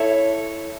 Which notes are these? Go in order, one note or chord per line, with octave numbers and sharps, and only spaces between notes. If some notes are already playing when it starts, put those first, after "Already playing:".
Already playing: E4 A4 C#5